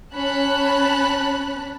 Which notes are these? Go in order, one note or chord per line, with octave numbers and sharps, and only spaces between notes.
C#4 A5 B5 F#6